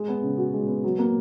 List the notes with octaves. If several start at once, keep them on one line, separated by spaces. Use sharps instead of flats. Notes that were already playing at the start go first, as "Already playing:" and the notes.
Already playing: G#3
B3
C#3
F#4
G#3
B3
F#3
A#3